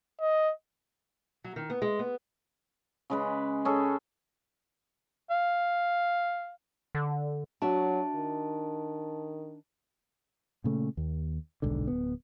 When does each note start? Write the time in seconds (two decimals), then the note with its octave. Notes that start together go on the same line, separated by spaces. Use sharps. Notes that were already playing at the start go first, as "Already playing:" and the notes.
0.21 D#5
1.44 F#3
1.56 D#3
1.70 B3
1.82 G#3
1.99 B3
3.10 C#3 G#3 B4
3.65 C#4 G#4 A4
5.30 F5
6.95 D3
7.62 F#3 D4 F#4 E5 A5
8.15 D#3
10.64 A#2 C#3 A3
10.97 D#2
11.62 D#1 B1 G#2 D3
11.87 D1 B3